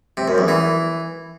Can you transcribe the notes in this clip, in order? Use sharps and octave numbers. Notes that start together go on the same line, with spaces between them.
C3
F#2
E2
E3